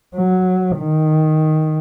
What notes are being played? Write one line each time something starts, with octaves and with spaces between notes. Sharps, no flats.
F#3
D#3